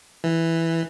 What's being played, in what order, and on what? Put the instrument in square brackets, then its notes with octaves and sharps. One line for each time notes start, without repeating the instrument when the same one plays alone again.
[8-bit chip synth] E3